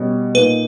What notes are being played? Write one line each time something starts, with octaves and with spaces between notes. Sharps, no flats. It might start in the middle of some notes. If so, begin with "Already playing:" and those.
Already playing: B2 G3 C#4
A#2 A#3 D#4 B4